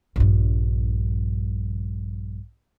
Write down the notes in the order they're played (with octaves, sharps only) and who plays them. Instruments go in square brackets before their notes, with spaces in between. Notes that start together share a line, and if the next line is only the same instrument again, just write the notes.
[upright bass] A#1 G2